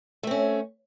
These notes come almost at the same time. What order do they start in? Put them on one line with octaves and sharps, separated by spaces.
A3 C4 C#4